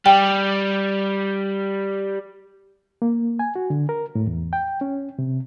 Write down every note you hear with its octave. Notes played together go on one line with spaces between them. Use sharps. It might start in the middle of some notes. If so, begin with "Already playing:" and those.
G3 G5
A#3
G#5
F#4
D3
A#4
A2
E2
G5
C#4
C3